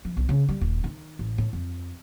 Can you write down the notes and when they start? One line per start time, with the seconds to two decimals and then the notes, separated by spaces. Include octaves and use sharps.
0.05 F3
0.17 B1
0.29 C#3
0.49 G3
0.61 D#1
0.84 D#3
1.19 A1
1.38 A2
1.53 F2